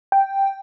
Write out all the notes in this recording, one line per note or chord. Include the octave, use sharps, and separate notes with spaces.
G5